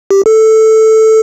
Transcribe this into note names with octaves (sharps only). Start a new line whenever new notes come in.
G4
A4